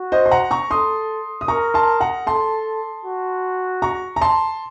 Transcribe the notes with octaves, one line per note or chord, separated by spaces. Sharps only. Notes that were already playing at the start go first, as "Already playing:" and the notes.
Already playing: F#4
C5 D#5
C6
F#5 A#5
A#5 C#6
A4 C6 D#6
D#6
A#4 A#5 C#6
A5 C6
F#5 A#5
A4 A5 C6
F#4
A#5 C#6
A#5
A5 C6